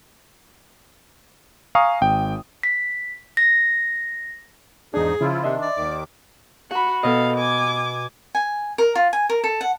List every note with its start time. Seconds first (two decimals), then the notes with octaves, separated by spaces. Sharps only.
1.75 F5 G#5 A#5 C#6 D#6
2.01 G#1 G5
2.63 B6
3.37 A#6
4.94 E2 G#2 D4 D#4 G#4
5.21 C#3 F3 E4 F4
5.44 C3 D#3 D4 D#5 E5 C6
5.62 D5
5.76 D#2 D#3 D6
6.71 F#4 F#5 B5
7.03 B2 A4 D#5 F5
7.37 G#5 D6
8.35 G#5
8.78 A#4
8.95 F4
9.13 G#5
9.29 A#4
9.44 A4
9.61 F#5